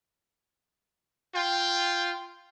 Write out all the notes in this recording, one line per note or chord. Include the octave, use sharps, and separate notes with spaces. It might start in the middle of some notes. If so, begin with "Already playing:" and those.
F4 G5